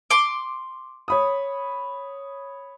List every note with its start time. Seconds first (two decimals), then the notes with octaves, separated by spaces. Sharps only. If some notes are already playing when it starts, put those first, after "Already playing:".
0.10 C6 D6
1.08 C#5 B5 D#6